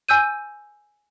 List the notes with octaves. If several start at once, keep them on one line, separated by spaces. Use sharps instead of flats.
G#5 E6 G6 D#7